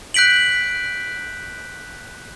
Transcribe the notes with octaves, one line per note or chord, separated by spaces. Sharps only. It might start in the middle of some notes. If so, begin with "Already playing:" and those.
F#6 G6 B6 D7 F#7